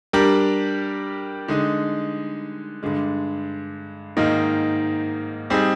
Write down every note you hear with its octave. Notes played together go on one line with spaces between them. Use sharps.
G3 D4 G4 A#4
D3 G#3 D#4
G2 D3 G#3
G#2 D#3 A#3 D#4
G3 C4 D#4 G#4